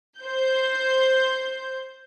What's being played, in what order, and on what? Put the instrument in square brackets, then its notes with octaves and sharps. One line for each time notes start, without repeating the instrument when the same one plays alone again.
[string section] C5 G6